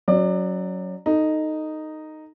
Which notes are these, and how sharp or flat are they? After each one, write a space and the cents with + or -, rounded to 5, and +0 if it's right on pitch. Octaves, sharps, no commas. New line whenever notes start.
F#3 -5 C#4 +0 D5 +25
D#4 -5 A4 +0